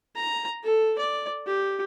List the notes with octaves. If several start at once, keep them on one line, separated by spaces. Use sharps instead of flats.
A#5
A4
D5
G4